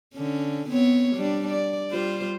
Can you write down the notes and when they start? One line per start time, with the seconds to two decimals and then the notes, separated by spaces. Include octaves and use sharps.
0.15 D3 C#4
0.69 B3 C4 C#5
1.16 G3 D4
1.50 D5
1.91 G3 F4 C5